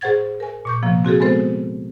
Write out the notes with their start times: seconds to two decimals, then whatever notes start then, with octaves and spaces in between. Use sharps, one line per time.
0.01 A2 G#4 C5 F#5 G#6 A6
0.40 A#4 G#5
0.65 A#2 C#6 G6
0.83 C3 F3 A#3
1.05 C4 F#4 G#4 A4
1.20 G#3 B3 C4 A4 C5